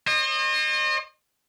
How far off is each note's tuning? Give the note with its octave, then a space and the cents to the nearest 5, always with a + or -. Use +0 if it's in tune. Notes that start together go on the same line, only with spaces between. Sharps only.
C5 +45 D#5 -30